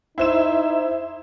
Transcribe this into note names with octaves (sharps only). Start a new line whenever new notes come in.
D#4 E4 C5 E7